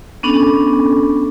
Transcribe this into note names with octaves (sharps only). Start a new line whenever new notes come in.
B3 C#4 D4 A4